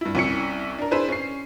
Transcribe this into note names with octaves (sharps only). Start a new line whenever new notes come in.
G2 E4
C2 C#4 E4 C#7
D4 A#4
D4 E4 G#4 B4 C5
C#4 C7